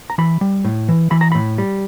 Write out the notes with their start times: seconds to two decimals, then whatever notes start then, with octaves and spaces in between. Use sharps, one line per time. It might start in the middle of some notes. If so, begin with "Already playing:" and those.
0.10 A#5
0.18 E3 B5
0.41 G3
0.65 A2
0.89 E3
1.11 E3 B5
1.21 A#5
1.32 A2 B5
1.58 G3